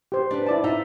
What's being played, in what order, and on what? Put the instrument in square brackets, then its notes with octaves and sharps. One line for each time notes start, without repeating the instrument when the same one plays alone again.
[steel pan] G4 C5
[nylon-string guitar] D4 B4
[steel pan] E4 D5 A5
[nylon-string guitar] D#4 F4 E5